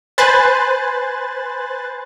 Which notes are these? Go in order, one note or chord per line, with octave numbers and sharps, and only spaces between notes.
B4 C5 G#5 F#6 A6